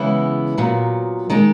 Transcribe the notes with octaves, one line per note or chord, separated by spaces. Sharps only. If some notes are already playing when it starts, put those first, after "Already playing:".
Already playing: C#3 E3 G#3 B3 E4
A#2 F#3 B3
D#3 G#3 D#4